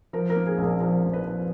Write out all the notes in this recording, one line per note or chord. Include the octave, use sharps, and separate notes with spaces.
F3 A#4
A#4
A#3
G#4
A#1
A#4
F3 A#4
A#1
B4
F3